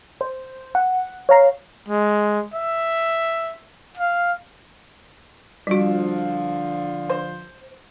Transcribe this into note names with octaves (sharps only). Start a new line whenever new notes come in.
C5
F#5
C#5 F5 A#5 C7
G#3
E5
F5
D3 F3 G3 F#4
C5